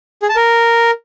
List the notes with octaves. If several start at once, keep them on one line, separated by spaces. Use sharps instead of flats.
G#4
A5
A#4